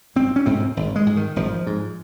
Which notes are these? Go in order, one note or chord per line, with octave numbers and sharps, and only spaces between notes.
G#1 C4
C#4
G#2 C4
G#1
G#3
G#2
D#3
G#1 F3
G#2